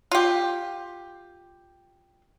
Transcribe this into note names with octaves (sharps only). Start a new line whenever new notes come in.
F4 G4